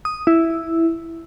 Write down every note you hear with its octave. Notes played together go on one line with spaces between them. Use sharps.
D#6
E4